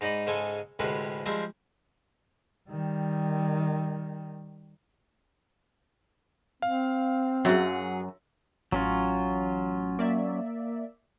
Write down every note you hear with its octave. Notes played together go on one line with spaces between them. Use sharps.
G#2 D#4 D5 D#5 B5
G#2 C#3 G#3 A4 G#5
D2 A2 C3 G#3 C#4 B4
F3 G3 G#3 C4 E5
D#3 G3
C4 F5
F#2 F#3 G#4
A1 F#3 C#4 F4
A#3 D5 E5